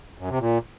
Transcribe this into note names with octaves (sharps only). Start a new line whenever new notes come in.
F#2
C3
A#2